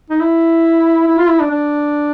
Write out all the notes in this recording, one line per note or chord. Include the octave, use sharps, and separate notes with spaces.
D#4
E4
E4
F4
E4
D4
D4